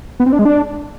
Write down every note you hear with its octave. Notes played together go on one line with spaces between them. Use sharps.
B3
C4
D4
G#3
D4